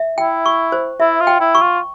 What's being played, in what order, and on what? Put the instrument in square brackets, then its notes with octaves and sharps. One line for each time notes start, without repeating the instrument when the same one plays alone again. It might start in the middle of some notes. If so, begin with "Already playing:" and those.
Already playing: [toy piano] E5
[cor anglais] E4 [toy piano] G5
[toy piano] C#6
C5
[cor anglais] E4 [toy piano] E5
[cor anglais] F4
[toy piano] G5
[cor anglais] E4
[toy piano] C#6
[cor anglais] F4